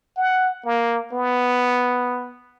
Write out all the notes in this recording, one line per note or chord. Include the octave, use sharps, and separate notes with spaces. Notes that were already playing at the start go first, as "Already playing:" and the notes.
F#5
A#3
B3